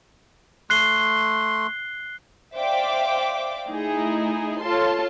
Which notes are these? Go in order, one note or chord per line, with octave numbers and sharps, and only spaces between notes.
A3 C6 F#6 C7 G7
C5 D5 E5 F5 G5 D6
A3 D#4 E4 G#4
F4 A4 C#5 A5 C6